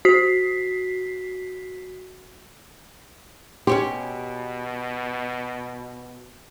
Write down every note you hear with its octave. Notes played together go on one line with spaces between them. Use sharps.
F#4 B6 C7
B2 C#4 G4 C#5 C6